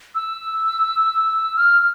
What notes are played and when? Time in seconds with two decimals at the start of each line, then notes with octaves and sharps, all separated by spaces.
0.15 E6
1.57 F6